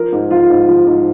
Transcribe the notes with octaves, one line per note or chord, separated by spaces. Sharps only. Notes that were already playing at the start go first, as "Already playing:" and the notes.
Already playing: F3 A#4
G#2
F3 F4
G#2
F3
G#2